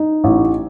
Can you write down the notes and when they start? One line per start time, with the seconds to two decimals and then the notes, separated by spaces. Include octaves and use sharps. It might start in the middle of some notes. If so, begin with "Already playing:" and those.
Already playing: D#4
0.24 A1